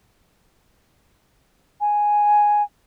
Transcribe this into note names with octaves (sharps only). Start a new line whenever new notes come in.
G#5